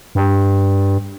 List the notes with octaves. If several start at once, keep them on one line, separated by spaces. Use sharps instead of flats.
G2